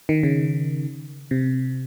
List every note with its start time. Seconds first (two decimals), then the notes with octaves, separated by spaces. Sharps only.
0.09 D#3
0.23 C#3
1.31 C3